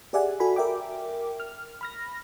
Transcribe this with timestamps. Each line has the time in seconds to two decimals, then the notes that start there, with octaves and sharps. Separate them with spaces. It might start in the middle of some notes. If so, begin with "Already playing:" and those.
0.13 G4 G#4 D5 E5 F#5 G#5
0.40 F#4 A4 G#5 B5
0.56 A#4 E5 G5 D6
1.40 F6
1.81 B5 F6 A#6